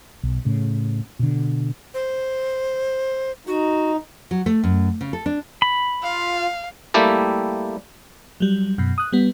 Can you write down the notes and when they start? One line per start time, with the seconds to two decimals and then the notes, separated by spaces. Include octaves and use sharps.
0.23 B1
0.45 A2 C#3
1.19 B2 D3
1.94 C5
3.47 D#4 F#4
4.31 F#3
4.46 A3
4.64 F#2
5.01 C#3
5.13 A4
5.26 D4
5.62 B5
6.03 F4 F5
6.94 G3 A3 A#3 E4 G4 A4
8.40 F#3 G3
8.78 F#2 B2
8.98 D#6 F#6
9.13 G3 B3